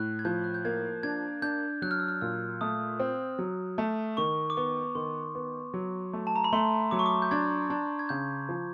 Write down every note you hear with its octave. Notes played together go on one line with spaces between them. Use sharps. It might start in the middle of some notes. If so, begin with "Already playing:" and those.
Already playing: A2 F#6
G#6
F3 G6
F#6
G6
A#3 G#6
D4 G#6
D4 G6
F#3 F#6
F6
E6
F6
A#2 E6
A3 D#6
C4
F#3
A3
D#3 C#6
D6
B3 C#6
D#3 C6
B3
F#3
A3
A5
A#5
B5
A3 C6
F#3 D6
C#6
D6
G6
D4 G#6
D4 G#6
G#6
C#3 G6
F3